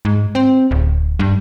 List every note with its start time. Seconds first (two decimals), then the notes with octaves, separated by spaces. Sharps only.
0.05 G#2
0.35 C4
0.71 D1
1.19 G2